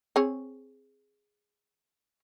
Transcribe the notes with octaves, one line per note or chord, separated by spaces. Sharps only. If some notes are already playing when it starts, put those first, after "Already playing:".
C4 G#4 C#5